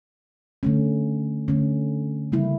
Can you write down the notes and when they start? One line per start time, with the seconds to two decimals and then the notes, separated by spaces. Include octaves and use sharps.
0.63 D3 A3 C#4
1.48 D3 A3 C#4
2.32 C#3 G3 A#3 E4